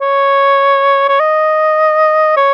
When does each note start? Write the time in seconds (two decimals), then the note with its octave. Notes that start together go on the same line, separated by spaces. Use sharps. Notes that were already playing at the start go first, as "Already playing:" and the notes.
0.01 C#5
1.09 C#5
1.20 D#5
2.37 C#5